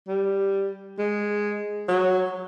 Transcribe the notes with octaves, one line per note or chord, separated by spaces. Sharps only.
G3
G#3
F#3